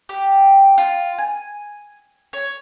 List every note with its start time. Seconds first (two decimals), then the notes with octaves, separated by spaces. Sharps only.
0.09 G4
0.78 F4
1.18 G#5
2.33 C#5